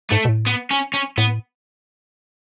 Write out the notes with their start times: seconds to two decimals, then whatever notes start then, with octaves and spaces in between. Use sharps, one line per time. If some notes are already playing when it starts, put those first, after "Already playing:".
0.10 G#2 A3
0.25 B2
0.29 A2
0.46 B3
0.71 C#4
0.94 C#4
1.18 A2 B3